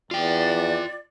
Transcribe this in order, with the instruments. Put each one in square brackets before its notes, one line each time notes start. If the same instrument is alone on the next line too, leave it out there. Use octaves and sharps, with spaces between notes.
[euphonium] E2 [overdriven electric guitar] F4 G5 [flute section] D5